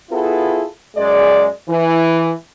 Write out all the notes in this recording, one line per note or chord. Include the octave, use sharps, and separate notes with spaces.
B3 E4 F4 G#4 A4
F#2 G#3 G#4 D5
E3